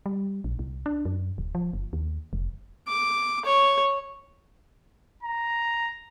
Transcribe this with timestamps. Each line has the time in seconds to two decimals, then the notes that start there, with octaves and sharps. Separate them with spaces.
0.06 G3
0.44 A#1
0.59 C2
0.86 D4
1.05 F#2
1.38 D1
1.55 F3
1.73 F#1
1.93 D#2
2.33 F1
2.88 D6
3.45 C#5
5.23 A#5